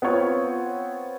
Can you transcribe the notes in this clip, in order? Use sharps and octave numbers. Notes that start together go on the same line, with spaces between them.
B3 C4 F4 C#5